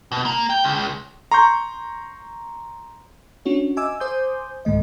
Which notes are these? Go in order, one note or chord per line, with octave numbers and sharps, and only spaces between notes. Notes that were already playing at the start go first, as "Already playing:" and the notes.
B2
A#3
G5
C#2
A#5 C6 C#6 G6
C#4 D4 F#4 C#5
D#5 E5 G#5 D6 E6
C5 G#5 C6 D6 D#6 G6
C2 G#2 D#3 A3 D#5